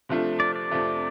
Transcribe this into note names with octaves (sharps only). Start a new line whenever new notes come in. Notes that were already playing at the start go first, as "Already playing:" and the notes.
C3 F3 A3 D4 F4
D5
D5
F2 C3 F3 A3